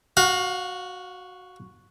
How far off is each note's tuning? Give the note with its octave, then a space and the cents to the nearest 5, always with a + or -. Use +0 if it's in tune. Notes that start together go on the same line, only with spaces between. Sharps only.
F#4 +0 F5 +30